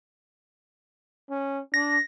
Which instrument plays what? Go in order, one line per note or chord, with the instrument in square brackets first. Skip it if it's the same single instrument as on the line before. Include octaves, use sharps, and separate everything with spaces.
[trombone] C#4
[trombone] D4 [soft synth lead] A#6